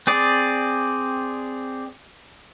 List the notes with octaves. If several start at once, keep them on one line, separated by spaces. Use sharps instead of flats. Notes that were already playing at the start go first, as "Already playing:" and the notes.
C4 G#4 D5